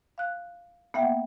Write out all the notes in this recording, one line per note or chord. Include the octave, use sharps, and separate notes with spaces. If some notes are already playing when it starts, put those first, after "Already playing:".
F5 F#6
A#3 B3 E5 F#5 G5